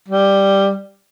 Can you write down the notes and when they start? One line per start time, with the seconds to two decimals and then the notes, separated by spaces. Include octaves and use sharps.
0.08 G3